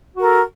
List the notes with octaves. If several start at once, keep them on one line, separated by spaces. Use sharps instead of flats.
F#4 A4 A#4